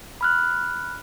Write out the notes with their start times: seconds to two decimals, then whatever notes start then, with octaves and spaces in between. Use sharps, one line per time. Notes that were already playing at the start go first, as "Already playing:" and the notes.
0.21 B5 F6 F#6